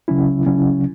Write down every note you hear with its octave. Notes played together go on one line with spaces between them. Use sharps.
C#2 C#3 F#3 C#4 E4
C#2 C#3 F#3 C#4 E4